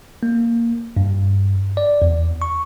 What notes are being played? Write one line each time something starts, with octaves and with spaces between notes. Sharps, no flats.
A#3
G2
D5
E2
C#6